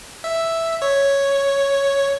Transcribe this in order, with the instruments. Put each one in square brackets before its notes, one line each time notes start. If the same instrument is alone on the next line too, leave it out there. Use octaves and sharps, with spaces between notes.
[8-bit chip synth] E5
C#5